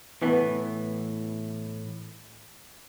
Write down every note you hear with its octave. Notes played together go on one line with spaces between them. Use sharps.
A2 E3 B3